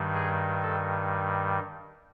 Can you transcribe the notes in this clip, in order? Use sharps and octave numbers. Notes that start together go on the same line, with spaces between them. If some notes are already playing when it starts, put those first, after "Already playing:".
Already playing: G2 D#3 G3
G#4
A4